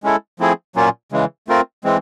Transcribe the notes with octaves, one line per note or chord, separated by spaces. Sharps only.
G#3 C#4 E4 A4
F3 A3 C4 E4 G#4
A#2 F#3 A#3 C#4 F4
C#3 E3 G#3
A3 C4 F4 A#4
E3 G#3 C4